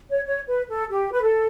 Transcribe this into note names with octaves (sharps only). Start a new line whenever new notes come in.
C#5
C#5
B4
A4
G4
B4
A4